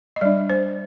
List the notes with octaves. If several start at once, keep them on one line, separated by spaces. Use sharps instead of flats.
D#5
G3 D4 D5
C5